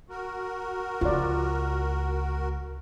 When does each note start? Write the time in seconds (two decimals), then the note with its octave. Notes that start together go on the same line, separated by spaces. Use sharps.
0.10 F#4 A#4
1.01 C#2 F4 D5